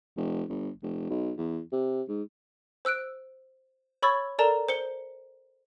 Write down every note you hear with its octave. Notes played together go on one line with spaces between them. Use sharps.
F1
G1
F1
B1
E2
C3
G#2
C5 E6 F#6 D7
C#5 B5 C#6 E6 G#6 A6
A4 A#4 D5 A5 A#5
C5 C#7 G7